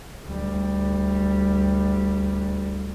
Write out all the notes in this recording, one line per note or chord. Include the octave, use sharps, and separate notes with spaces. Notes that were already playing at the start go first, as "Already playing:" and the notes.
D2 G3